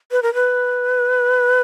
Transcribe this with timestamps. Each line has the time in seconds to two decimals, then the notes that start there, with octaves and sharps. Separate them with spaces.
0.12 B4
0.23 A#4
0.34 B4